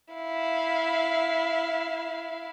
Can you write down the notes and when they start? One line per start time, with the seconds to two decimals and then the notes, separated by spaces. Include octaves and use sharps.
0.14 E4 F5